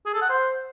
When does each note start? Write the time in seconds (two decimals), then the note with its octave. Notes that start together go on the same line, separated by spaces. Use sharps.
0.06 G#4
0.14 A4
0.22 F#5
0.29 C5